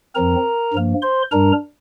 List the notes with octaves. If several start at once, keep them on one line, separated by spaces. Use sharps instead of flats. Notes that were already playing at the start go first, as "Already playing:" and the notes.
F2 F3 C4 A#4 A#5
G2 F3 A#3
C5 C6
G2 G3 D4 A#4 A#5